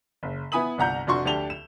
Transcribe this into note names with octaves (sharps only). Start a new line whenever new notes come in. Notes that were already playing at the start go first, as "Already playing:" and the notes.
F#1
B3 E4 G#5 B5 D#6 F#7
G1 C2 F#5 A#5 G6
F1 D4 F#4 C6 C#6
D2 D4 G4 A5 F7 G7
E7